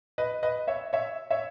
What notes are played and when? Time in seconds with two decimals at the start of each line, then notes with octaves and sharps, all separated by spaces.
0.18 B4 D#5
0.43 B4 D#5
0.68 C#5 E5
0.93 C#5 E5
1.30 C#5 E5